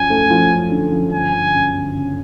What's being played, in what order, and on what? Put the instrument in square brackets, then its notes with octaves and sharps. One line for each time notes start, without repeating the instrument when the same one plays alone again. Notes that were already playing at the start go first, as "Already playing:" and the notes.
Already playing: [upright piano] F#2 F3 [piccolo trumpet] G#5
[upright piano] A3
F3
F#2
D3
F3
[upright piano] G1 [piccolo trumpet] G#5
[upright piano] G1
F#2
G1
C#3